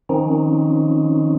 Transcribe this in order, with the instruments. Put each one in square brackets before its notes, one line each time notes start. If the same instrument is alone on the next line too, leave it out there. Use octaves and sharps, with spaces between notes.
[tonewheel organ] D#3 F3 C4 C#4 D#4